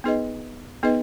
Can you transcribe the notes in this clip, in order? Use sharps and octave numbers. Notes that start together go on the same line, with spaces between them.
B3 D#4 G#4 B4 D#5
B3 D#4 G#4 B4 D#5